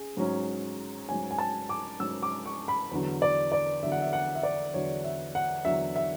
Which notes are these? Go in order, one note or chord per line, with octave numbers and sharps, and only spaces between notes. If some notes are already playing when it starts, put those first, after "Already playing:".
Already playing: C#4 G#4
G#2 F#3 C#4
G#2 F#3 C#4 G#5
G#5
A5
D6
G#2 F#3 C#4 E6
D6
C#6
B5
E2 D3 F#3
D5
D5
E2 D3 F#3 E5
F#5
E5
F#5
E5
D5
E2 D3 F#3 C#5
E5
F#5
E2 D3 F#3 E5
E5